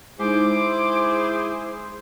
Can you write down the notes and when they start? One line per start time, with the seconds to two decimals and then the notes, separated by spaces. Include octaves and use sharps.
0.20 G#3 D#4 E4 G#4 C5 D6